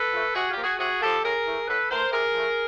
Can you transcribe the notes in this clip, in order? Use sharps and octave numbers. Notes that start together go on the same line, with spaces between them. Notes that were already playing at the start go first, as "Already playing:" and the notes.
Already playing: A4 B4
F3 A3
C3 F#4 G#4
F4 G4
F3 A#3
F#4 G#4
C3 F#4 G#4
F3 A#3 G4 A4
A2 G#4 A#4
E3 A3
A2 A4 B4
E3 A3 A#4 C5
C3 G#4 A#4
F3 A3